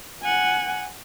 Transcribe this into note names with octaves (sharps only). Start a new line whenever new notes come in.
F#5 G#5